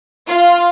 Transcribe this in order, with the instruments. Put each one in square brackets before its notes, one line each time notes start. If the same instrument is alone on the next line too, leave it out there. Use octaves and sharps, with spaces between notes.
[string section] F4